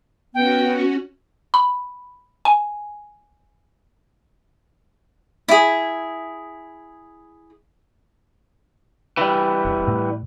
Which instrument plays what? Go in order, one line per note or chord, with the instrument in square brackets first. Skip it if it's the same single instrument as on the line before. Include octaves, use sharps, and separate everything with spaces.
[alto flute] B3 [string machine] C#4 F#4 [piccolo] G5
[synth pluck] B5
G#5
[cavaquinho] E4 G#4
[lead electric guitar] E3 G3
[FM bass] E1
A2